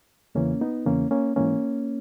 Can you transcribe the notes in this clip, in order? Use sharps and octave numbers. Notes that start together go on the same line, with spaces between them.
E2 C#3 E3 A#3 C#4
B3 D#4
E2 C#3 E3 A#3 C#4
A#3 C#4
G#2 E3 A#3 C#4